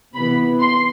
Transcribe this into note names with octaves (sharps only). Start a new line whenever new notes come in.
C3 E3 B3 B5
C6